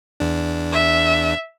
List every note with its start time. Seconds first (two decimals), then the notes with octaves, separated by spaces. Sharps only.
0.20 E2 D4
0.72 E5